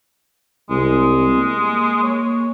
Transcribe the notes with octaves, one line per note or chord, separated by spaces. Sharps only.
C2 G#3
A#3
C#5